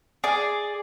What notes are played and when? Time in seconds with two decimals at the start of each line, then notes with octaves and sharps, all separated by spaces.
0.24 G#4 D5